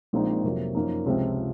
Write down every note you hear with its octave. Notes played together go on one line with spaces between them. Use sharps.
A#1 A#2 G#3 C4 D#4
F2 C3 F#3 A#3
F#2 F3 A#3 D#4
C#2 C3 F3 C4